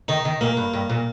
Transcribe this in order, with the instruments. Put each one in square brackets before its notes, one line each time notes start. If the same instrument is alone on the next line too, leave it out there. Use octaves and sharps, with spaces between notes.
[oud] D#3 [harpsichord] D#4
[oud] D#3
[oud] A#2 [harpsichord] A#3
[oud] G2
G2
A#2